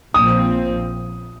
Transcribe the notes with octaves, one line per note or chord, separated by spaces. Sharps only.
A#1 A#2 F3 C4 D#6